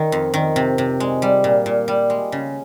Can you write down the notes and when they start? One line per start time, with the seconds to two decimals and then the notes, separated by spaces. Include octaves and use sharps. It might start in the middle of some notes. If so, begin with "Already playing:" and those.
Already playing: D#3
0.12 F2
0.34 D#3
0.56 C3
0.78 C3
1.00 G#3
1.22 G3
1.44 A#2
1.66 A#2
1.88 G3
2.10 G#3
2.32 C#3